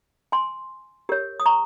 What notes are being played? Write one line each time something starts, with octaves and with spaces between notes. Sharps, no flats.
G#5 C6
G4 A#4 C#5
D#6
A#5 C#6